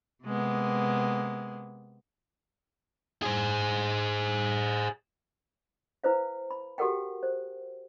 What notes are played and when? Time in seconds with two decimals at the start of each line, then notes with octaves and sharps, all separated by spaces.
0.24 C3 G#3 A#3 B3
3.23 G#4 C5
6.04 E4 B4 C5 F5
6.51 B5
6.78 F#4 G4 A4 A#4 F#5 G5
7.23 C5